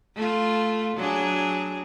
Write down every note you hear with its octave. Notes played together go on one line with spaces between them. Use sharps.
A3 F4
F#3 D4 G#4